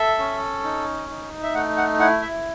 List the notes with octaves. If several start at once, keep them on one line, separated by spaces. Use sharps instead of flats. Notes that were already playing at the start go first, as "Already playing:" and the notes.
Already playing: A4 E5
C#4
D#4
D#4
E5
A3 F#5
F#5
E4 F#5
E5